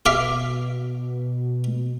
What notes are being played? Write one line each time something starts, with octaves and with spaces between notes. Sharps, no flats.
B2 E5 F5 D6